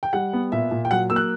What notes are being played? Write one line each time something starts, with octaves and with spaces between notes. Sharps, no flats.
G5
G3 F#5
B3
A#2 E5
A#2
G5
F#3 F#5
A#3 E6
F#6